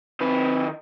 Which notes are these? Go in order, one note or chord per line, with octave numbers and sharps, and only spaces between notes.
D#3 C4 B4